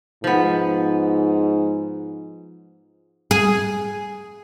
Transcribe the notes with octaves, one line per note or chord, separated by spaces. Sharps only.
G#2 F3 B3
G#4